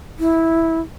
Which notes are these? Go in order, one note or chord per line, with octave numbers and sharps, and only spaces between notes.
E4